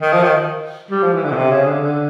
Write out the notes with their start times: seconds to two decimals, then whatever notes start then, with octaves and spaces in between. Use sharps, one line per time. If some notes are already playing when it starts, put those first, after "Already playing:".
0.01 D#3
0.13 F3
0.23 D#3
0.91 G3
1.02 F3
1.14 E3
1.25 D3
1.32 B2
1.36 C3
1.51 C#3
1.66 D3
1.81 D3